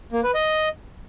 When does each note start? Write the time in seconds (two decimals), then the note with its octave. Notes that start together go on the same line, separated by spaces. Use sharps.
0.13 A#3
0.24 B4
0.35 D#5